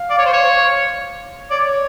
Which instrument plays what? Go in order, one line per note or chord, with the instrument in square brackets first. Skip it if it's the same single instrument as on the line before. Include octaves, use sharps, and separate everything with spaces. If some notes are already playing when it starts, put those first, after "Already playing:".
Already playing: [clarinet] F5
[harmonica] D5
C#5
C5
C#5
[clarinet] C#5 [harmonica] D5